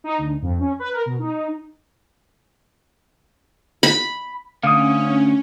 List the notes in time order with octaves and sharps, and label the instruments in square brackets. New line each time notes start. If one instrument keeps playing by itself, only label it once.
[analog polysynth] D#4
D2
F2
C#4
B4
A#4
B2
D#4
[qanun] B5
[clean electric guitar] D2 D3 [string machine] C#4 [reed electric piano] F5 D#6